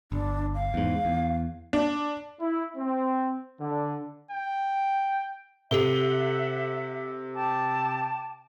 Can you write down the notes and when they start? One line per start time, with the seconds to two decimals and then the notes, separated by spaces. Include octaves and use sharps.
0.12 G1 D4
0.54 F5
0.74 E2 G#2
1.05 E2
1.73 D4
2.40 E4
2.76 C4
3.59 D3
4.31 G5
5.71 C3 G4 A4 E5 F#5 G7
7.35 G5 A5 D6